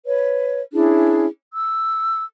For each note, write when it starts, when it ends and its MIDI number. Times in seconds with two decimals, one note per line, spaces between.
0.06 0.60 71
0.06 0.60 73
0.73 1.27 61
0.73 1.27 62
0.73 1.27 64
0.73 1.27 68
1.54 2.23 88